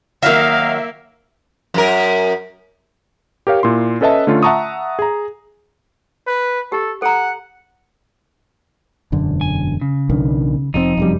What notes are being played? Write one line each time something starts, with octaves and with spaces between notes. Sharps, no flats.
D#3 F#3 A#3 E5 F5
F#2 A#4
G4 A#4 C#5 F5
A#2 E4 C6
C#4 A4 B4 D#5 E5 A5
D3 A3 C#4 F4
E5 F#5 A5 A#5 C#6 D#6
G#4 A#5
B4
G4 A4
A4 F#5 A#5
E1 F#2 D3
G#5
C#3
B1 D#3 D4
F1 F2 C3 C4 D#4
F1 F#2 G3